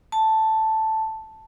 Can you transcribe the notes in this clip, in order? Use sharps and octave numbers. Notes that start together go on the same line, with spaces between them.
A5